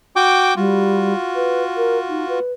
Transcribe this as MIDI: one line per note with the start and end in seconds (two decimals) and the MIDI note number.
0.16 0.54 66
0.16 0.54 79
0.16 0.54 86
0.56 1.14 55
0.56 2.39 65
0.56 2.39 66
1.36 1.63 71
1.77 1.98 70
2.09 2.28 63
2.29 2.53 71